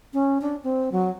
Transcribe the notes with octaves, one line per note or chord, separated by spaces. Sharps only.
C#4
D4
C4
F#3